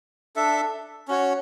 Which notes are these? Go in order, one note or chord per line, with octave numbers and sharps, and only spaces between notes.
D4 A4 E5
C#4 F#4 C#5